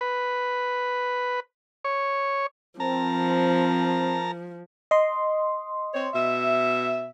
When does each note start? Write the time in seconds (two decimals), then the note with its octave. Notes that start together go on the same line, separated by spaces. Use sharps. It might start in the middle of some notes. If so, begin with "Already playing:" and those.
0.01 B4
1.85 C#5
2.80 F3 C4 A#4 A5 A#5
4.91 D#5 C6
5.94 C4 C#5
6.13 B2 E5